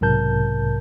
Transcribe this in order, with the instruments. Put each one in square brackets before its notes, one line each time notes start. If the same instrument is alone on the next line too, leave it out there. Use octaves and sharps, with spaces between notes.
[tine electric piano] B1 G#2 C3 A#4 A5 G6